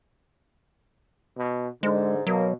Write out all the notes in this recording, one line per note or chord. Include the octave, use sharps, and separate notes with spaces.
B2
G#2 D3 G#3
B2 F#3 A#3